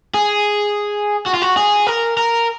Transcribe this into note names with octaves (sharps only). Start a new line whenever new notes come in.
G#4
F#4
F4
F#4
G#4
A#4
A#4